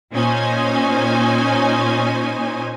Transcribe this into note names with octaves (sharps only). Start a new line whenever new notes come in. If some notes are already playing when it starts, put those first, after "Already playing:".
A#2 C#4 D#4 C5 G#5